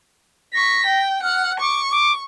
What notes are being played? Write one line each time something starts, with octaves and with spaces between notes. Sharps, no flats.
C#6 A#6 B6
G5
F#5 F6
C#6 D6
D6